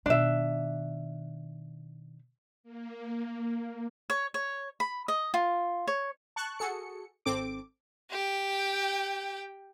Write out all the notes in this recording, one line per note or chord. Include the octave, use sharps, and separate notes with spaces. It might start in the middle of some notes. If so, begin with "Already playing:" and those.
B2 D#3 D4 E5
A#3
C#5
C#5
B5
D#5
F4
C#5
A5 C#6 F#6
F#4 G#4 A4 C#7
G#1 C4 A4 D6 D7
G4 G5